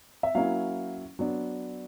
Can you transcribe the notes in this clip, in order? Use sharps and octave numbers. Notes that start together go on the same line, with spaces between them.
E5
F#3 A#3 C#4 E4 F5
F#3 B3 D4